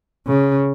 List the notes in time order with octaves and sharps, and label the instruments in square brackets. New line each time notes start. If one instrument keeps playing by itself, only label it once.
[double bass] C#3